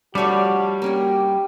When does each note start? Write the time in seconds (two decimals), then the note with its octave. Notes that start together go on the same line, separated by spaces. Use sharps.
0.15 F3 G3 A3 D4 F#4 C#5 D5
0.82 A#3 C#4 G4 A#4